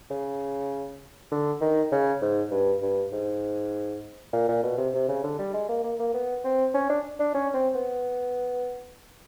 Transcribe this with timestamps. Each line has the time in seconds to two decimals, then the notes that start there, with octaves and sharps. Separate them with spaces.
0.11 C#3
1.31 D3
1.61 D#3
1.92 C#3
2.22 G#2
2.51 G2
2.82 G2
3.12 G#2
4.33 A#2
4.49 A#2
4.63 B2
4.78 C3
4.94 C3
5.09 C#3
5.24 D3
5.39 G3
5.54 G#3
5.69 A#3
5.84 A#3
5.99 A#3
6.14 B3
6.44 C4
6.74 C#4
6.90 D4
7.19 D4
7.35 C#4
7.54 C4
7.75 B3